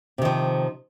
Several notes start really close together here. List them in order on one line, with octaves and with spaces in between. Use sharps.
C3 D#3 F3